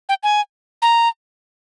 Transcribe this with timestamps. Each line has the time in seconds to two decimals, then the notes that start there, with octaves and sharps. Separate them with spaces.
0.09 G5
0.23 G#5
0.82 A#5